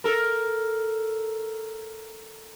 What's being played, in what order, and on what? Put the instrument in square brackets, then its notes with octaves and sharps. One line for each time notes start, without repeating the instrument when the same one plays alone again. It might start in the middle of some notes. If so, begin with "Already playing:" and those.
[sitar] A4 A#4